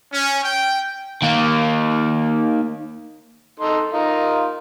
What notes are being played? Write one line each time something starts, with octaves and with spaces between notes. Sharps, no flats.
C#4
G5
D#3 A#3
D#4 A4 C6
D#4 F4 A#4